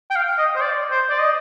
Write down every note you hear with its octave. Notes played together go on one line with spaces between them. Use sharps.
G5
F5
D#5
C5
D5
C5
D5
D#5